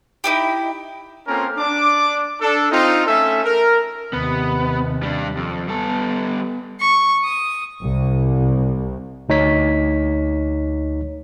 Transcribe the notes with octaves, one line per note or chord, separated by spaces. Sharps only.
D#4 E4 G4
A#3 C4 C#4 F4 A4 A#4
D4 D6
D4 A4
C4 D#4 F4
A3 C#4 A4 E5
A#4
D#2 C3 B3
G3 D4
F2
G3 B3 A4
C#6
D#6
C2
D2 D#4 C#5 B6